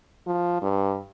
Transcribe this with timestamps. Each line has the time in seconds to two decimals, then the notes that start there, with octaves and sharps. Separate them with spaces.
0.27 F3
0.62 G2